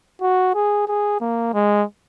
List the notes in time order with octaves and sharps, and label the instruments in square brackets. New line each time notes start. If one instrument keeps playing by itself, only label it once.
[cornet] F#4
G#4
G#4
A#3
G#3